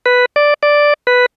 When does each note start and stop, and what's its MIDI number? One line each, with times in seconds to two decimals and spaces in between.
0.06 0.25 71
0.36 0.54 74
0.63 0.94 74
1.07 1.26 71